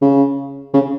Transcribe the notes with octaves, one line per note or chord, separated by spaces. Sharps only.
C#3
C#3